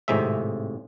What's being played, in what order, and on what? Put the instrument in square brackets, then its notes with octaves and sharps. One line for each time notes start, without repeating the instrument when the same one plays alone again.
[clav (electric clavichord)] G#1 A2 C3 G#3 E5